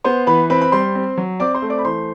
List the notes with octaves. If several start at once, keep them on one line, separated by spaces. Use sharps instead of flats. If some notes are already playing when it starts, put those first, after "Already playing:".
B3 C5 C6
E3 B4 B5
C4 B4 B5
B5
G3 C5 C6
C4
F#3
C4 D5 D6
C5 C6
A3
D5 D6
B5
E3 C5 C6